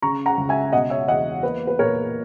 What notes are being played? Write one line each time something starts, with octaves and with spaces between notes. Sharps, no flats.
C#3 A#5 C#6
F#5 A#5
C#2
E5 G#5
B2 D#5 F#5
C#5 E5
E2 D#5 F#5
A#3 B4
B4
A#2 A#4 C#5